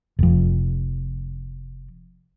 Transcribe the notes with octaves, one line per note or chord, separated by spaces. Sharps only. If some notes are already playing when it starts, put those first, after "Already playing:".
F1 F2